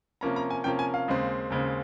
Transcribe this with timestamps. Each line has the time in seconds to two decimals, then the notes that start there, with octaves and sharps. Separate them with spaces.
0.21 C3 F3 A#3 C#4 A#5
0.36 A#5
0.50 G#5
0.64 C3 F3 A#3 C#4 G5
0.79 G#5
0.94 F5
1.08 D#2 C#3 G#3 C4
1.50 D#2 C#3 G#3 C4